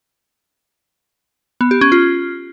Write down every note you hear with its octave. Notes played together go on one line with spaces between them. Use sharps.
B3
G4
C#4
F4